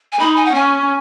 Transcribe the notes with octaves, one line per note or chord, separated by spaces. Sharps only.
G#5
D#4 B5
G#5
F#5
C#4 G#5